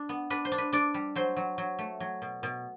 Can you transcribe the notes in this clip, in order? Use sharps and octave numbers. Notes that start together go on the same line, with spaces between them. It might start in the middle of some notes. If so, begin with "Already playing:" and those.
Already playing: D4
B3
D4 B4
C5
D4
B4
D4 D5
G3
F#3 C5
F#3
F#3
A3
F#3
B2
B2